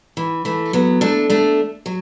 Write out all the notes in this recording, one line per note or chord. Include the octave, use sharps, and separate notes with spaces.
E3
E3 A3
F#3 B3
A3 D4
A3 D4
F#3